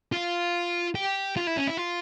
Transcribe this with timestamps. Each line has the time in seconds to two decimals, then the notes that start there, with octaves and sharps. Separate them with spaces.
0.12 F4
0.95 G4
1.36 F4
1.47 E4
1.57 C#4
1.68 E4
1.78 F4